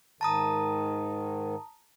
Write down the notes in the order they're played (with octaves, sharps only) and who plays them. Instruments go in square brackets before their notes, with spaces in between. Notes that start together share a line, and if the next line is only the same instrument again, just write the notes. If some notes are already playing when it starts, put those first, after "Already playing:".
[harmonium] G#2 D#3 [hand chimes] A5 A#5 D#6